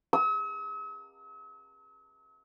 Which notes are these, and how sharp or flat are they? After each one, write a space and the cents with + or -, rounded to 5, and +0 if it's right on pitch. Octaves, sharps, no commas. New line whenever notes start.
E6 -45